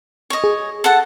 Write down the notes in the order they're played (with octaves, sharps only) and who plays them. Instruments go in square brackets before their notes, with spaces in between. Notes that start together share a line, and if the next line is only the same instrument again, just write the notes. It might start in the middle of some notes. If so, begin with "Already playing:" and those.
[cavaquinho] C#5 D#5
[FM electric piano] G#4
[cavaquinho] A4 F#5 A5